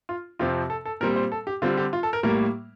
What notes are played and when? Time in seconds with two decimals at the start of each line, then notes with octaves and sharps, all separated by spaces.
0.09 F4
0.39 F2 C3 F3 C4 F4
0.70 A4
0.85 A4
1.01 A#2 G3 C4 A#4
1.16 C5
1.32 A4
1.47 G4
1.62 D3 G3 C4 F4
1.77 G4
1.93 F4
2.03 A4
2.13 A#4
2.23 A2 G3 A#3 A#4